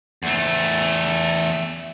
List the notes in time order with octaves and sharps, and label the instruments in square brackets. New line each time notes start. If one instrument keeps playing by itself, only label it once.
[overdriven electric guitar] E2 A3